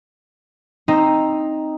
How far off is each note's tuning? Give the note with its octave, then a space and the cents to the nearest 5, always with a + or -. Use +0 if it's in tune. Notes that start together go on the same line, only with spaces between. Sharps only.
C4 +10 D#4 +0 A#5 +0